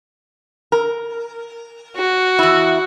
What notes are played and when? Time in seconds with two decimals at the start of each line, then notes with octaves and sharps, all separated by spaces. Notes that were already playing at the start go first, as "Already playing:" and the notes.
0.72 A#4
1.96 F#4
2.39 E2 E4